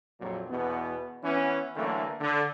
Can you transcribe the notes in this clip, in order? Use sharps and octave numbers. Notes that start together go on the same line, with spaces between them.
A#1 F2 A#2 F#3
E2 B2 B3
E3 B3 C#4
D3 E3 F#3 A3 A#3
D3